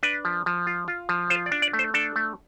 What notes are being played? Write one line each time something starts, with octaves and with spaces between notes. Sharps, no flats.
D4 B4
F3
F3
F4
F4
F3
F4 C5
D5
D4
D5
A3
C5
D4 A4
A3